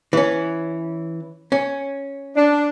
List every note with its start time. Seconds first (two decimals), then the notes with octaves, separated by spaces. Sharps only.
0.13 E3 C#4
1.52 C#4
2.37 D4